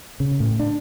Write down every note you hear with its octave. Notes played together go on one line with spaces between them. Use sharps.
C#3
A2
D4